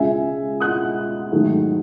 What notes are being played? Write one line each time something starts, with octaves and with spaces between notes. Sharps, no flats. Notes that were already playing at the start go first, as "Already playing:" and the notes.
Already playing: C#2 C#3 G#3 E5 G#5
D#6 F#6
G#2 D#3 F#3 A3